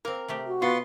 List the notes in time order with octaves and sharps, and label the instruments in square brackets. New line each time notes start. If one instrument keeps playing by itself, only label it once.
[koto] A#3 C4 [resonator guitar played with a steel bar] A#4
[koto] C3 A3 G4
[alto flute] F#4
[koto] B2 [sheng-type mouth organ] B3 C6 C#6 [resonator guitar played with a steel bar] F4